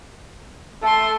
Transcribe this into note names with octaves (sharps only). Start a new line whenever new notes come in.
A3 A4 C6